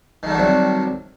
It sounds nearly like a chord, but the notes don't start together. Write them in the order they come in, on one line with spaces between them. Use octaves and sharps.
D#3 A3 G3 F#3 C3